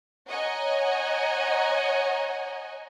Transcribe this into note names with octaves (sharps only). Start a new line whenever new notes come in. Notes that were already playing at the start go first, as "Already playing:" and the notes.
C#5 D#5 F#5 G#5 A#5